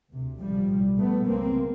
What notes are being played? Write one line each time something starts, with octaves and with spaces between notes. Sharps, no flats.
D2 C3
A1 G#2 F3 G3
B1 A2
C2 A#2 A3 B3
C#2 C#3 A#3 C4